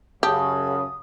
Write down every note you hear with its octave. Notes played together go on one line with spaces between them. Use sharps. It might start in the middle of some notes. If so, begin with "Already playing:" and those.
F#2 C#3 G4 A5 D#6